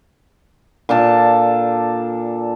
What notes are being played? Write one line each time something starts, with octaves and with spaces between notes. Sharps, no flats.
A#2 D4 A4 A5